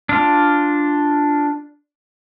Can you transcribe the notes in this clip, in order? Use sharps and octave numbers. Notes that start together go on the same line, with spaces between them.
D4 F4